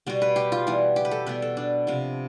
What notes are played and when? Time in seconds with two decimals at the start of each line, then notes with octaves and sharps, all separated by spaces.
0.06 B2 G3 B3
0.22 B4
0.36 G4
0.52 F4
0.67 E3 G3 B3
0.96 G4
1.05 B4
1.11 A4
1.26 B2 G3 B3 B4
1.42 A4
1.57 D4
1.87 C3 F3 B3